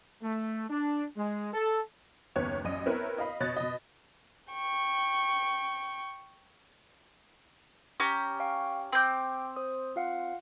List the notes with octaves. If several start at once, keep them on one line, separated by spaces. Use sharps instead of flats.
A3
D4
G#3
A4
F#1 D#2 B3 C#5
A1 F#2 D5 D#5 D#7
B3 C4 E4 A#4 B4 C#5
D#5 F5 B5
B2 C#5 D#5 F#6 A6
B2 D#5
G5 C#6
C#4 G4 A#5
F5 G5 C#6
C4 G5 C6 D6 G6
C5 D#6
F4 F5 F#5